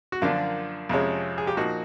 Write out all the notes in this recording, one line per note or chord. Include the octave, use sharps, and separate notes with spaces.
F#4
F#2 D3 F3 A#3 D4 F4
F2 C3 F3 G#3 C#4
G#4
G4
A#2 F3 A#3 D#4 F#4